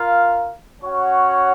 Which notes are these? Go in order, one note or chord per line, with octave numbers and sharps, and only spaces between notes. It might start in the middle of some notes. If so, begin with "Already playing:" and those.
Already playing: F4 A#4 F5
C#4 F#4 C#5 F#5